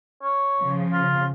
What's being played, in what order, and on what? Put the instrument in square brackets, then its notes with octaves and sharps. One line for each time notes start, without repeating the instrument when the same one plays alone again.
[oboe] C#5
[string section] C#3 F3
[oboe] F4